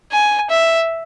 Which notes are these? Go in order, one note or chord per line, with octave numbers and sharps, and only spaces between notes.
G#5
E5